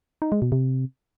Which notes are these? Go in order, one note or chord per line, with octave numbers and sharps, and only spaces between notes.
D#4
G#3
B2
C3